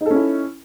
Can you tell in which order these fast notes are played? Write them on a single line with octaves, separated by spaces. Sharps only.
D#4 A4 C#4 E4